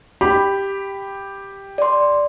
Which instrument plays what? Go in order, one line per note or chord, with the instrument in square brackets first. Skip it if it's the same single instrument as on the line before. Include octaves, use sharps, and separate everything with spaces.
[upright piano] G4 B5
[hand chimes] D5 C6